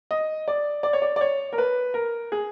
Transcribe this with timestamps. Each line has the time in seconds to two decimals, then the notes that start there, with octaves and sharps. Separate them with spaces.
0.11 D#5
0.48 D5
0.83 D5
0.93 C#5
1.02 D5
1.16 D5
1.21 C#5
1.53 A#4
1.58 B4
1.94 A#4
2.32 G#4